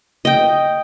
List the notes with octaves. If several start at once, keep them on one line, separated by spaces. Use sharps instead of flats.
D#5 G5